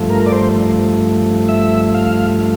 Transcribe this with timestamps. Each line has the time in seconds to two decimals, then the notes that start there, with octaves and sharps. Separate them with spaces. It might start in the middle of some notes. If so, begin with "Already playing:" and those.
Already playing: G2 F3 A3
0.10 A#4
0.26 D5
0.32 C5
1.49 E5
1.94 F5